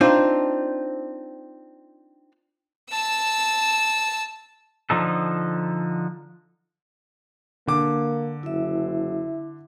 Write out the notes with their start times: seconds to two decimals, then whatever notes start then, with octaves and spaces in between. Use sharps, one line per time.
0.01 C4 D4 D#4 F4
2.90 A5 E6
4.90 D3 F3 D#4 A4
7.67 D3 A#3 D6
8.43 F#1 E4 E5